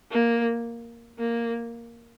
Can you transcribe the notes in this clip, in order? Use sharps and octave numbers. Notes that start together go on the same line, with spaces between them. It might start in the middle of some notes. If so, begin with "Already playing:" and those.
A#3
A#3